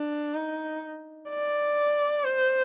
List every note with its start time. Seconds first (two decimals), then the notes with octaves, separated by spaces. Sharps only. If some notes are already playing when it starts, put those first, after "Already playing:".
Already playing: D4
0.35 D#4
1.30 D5
2.24 C5